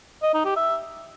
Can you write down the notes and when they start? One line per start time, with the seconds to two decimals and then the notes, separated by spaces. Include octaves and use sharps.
0.23 D#5
0.34 D#4
0.45 G4
0.57 E5